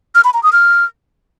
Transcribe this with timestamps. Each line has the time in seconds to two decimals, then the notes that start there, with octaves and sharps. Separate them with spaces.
0.15 F6
0.24 B5
0.34 A#5
0.43 D#6
0.52 F6